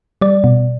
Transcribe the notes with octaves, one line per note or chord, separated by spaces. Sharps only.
G3 D5
B2